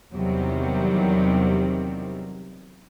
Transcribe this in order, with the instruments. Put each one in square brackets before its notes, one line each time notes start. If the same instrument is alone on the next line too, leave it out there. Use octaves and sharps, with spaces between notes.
[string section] E2 C3 D#3 F#3 G3